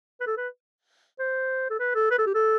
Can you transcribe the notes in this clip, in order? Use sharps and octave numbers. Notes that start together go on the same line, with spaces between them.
B4
A4
B4
C5
A4
B4
A4
B4
A4
G4
A4